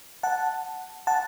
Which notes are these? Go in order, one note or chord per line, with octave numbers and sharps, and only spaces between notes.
F#5 A5
F#5 A5